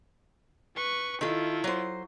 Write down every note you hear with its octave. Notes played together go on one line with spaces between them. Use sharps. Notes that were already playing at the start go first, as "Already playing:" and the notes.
B4 C#6
D#3 E4 F4 A4
F#3 C5